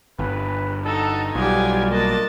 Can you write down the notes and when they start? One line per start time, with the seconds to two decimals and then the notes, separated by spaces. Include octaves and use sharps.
0.19 G1 B4
0.86 D#4 F#4 A4
1.35 B1 G3 B3 D#4 F4 G4 G#5
1.91 A#3 D4 F4 D#5 A5